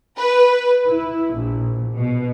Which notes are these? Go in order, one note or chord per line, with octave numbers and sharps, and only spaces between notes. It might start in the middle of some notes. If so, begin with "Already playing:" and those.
B4
E4
A#1
B2